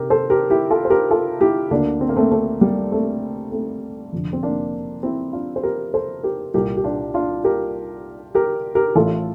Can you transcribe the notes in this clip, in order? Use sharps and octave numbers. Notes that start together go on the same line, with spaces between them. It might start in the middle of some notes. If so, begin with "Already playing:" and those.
Already playing: C3 G4 A#4
A4 C5
G4 A#4
E4 G4
F4 A4
C5
G4 A#4
F4 A4
E4 G4
D2 D3 A#3 D4
C4
A#3
A3 C4
A3 C4
G3 A#3
A3 C4
A3 C4
F1 F2 D3
C4
A#3 D4
C4 E4
D4 F4
C5
G4 A#4
A4 C5
G4 A#4
C2 A#2 G4 A#4
G4
D4 F4
D4 F4
G4 A#4
G4 A#4
G4 A#4
A1 A2 E3 F4 A4